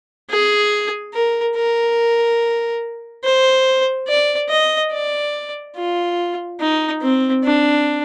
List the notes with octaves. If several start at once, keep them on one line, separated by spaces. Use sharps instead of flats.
G#4
A#4
A#4
C5
D5
D#5
D5
F4
D#4
C4
D4